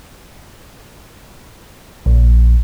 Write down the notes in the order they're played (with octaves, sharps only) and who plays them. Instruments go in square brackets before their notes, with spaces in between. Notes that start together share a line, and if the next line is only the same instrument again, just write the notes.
[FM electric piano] A#1